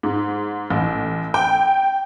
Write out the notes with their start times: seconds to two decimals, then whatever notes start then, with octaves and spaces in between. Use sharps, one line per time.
0.03 G#2
0.70 A1
1.34 G5